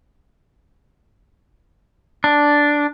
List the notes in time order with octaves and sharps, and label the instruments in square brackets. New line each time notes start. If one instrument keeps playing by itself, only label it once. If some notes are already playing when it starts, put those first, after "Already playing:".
[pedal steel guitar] D4